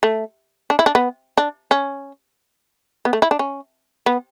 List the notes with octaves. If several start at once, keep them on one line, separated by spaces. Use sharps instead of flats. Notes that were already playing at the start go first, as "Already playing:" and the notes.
A3
D4
E4
D4
B3
D4
C#4
B3
A3
E4
D4
C#4
B3